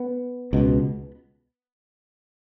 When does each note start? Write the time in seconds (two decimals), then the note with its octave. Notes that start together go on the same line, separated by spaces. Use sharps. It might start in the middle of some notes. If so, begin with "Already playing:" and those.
Already playing: B3
0.53 C#2 B2